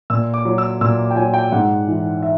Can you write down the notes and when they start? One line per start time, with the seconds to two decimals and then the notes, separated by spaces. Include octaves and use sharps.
0.10 A#2 E6
0.34 D6
0.45 F#3
0.58 E6
0.81 A#2 E6
0.99 D6
1.11 G5
1.16 F#3 G#5
1.34 G5
1.52 G#2 F#5
1.87 E3
2.23 E5